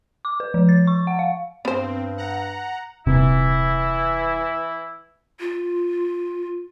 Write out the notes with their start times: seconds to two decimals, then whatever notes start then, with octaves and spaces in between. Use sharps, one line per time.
0.25 D6
0.40 B4
0.54 F3
0.69 A6
0.87 C#6
1.07 F#5
1.19 F5
1.65 G2 B3 C4 C5
2.18 F#5 A#5
3.07 D#1 C3 E3 E4
5.40 F4